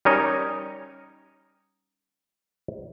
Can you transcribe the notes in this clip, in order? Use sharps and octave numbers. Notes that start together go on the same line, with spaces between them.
G3 C#4 D#4 A#4 C#5 D#5